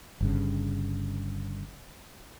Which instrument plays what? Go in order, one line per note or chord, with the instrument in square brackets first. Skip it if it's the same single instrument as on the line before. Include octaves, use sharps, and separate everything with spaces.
[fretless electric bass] G1 G2 C#3